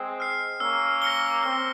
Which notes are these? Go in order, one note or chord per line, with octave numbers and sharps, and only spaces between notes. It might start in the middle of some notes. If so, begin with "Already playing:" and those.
Already playing: G#3 C4
F6 C7
A#3 C#4 E6
A#6 C#7 G7
C4 E6